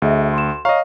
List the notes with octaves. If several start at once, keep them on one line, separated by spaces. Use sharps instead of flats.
D2 G#4 D#5 E5
C6 E7
C#5 D#5 F5 A#5 C#6